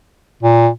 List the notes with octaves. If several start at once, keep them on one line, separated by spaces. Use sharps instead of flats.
A#2